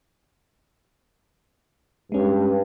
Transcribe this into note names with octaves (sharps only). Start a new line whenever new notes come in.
G2 G#3 C#4